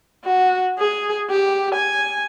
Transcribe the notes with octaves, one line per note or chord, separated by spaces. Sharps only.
F#4
G#4
G4
G#5